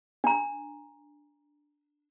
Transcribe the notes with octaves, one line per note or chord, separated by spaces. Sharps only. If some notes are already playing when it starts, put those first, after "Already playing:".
D4 A#5